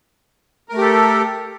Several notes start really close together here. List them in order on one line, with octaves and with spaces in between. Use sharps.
A#4 A3 G4 A4